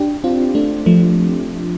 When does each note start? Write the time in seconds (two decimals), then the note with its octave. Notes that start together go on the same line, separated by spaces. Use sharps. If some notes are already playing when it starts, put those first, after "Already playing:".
Already playing: D4 G4
0.24 C4 F4
0.55 A3 D4
0.86 F3 A3